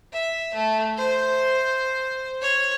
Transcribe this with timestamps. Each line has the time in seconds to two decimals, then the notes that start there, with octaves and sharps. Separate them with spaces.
0.13 E5
0.54 A3
0.97 C5
2.42 C#5